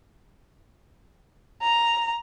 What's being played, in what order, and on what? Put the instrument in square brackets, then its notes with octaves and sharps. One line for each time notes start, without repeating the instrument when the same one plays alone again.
[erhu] A#5